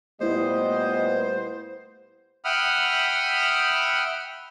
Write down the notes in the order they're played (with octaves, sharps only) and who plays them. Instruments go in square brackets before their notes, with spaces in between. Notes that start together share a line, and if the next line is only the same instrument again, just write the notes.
[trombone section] A#2 G3 B3 [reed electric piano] A3 E4 [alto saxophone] C5 [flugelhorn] D#5
[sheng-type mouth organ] E5 F#5 G5 B5 D#6 F6